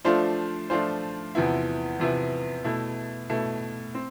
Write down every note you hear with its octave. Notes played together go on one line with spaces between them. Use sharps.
F3 A3 D4 F4 C5
F3 A3 D4 F4 C5
E2 C3 F3 B3 E4
E2 C3 F3 B3 E4
B2 A3 E4
B2 A3 E4
C4